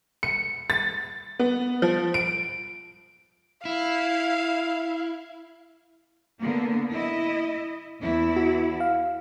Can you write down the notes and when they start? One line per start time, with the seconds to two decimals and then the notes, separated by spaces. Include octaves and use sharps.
0.23 C#7
0.70 A6
1.39 B3
1.82 F3
2.14 D7
3.65 E4 F5
6.42 D3 A#3 B3
6.93 E4 D#5
8.01 E2 E4
8.36 F#4
8.80 F5